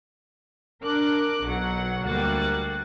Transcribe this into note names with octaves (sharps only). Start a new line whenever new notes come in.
D4 A#4 D6 F#6
B1 B2 F#3 F#5
D2 G3 A#3 F#4 F#6 A6